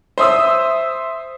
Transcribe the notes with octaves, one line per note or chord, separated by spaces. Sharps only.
C5 E5 D#6 E6